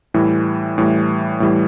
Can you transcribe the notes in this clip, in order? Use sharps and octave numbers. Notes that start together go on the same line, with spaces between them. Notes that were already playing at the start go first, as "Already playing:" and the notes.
A2 E3 G3
A2 E3 G3
A2 E3 G3